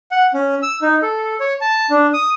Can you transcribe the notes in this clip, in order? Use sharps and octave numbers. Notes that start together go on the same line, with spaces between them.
F#5
C#4
E6
D#4
A4
C#5
A5
D4
D#6